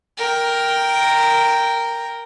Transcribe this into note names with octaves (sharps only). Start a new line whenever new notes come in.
A#4 G5